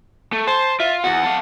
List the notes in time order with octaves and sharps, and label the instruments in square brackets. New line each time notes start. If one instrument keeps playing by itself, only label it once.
[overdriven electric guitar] A3
[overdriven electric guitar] C5 [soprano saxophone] A5
[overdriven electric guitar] F4 [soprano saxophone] E5
[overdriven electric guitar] E2 [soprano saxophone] F#5
[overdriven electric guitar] A4 F5